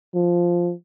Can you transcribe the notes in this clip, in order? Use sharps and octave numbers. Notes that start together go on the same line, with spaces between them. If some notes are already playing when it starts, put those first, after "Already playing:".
F3